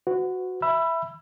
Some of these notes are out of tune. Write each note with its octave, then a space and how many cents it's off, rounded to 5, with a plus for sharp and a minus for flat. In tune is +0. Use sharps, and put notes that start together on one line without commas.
F#4 -5 B4 +40
E5 +0 B5 +0 E6 +25